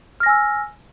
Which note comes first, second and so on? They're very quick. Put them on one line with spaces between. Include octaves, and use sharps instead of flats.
F6 A#6 G#5 E6